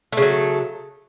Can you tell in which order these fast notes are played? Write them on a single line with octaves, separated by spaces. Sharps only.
A3 C#3 F#3